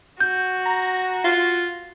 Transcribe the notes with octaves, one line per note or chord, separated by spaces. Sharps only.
F#4 G6
A#5
F4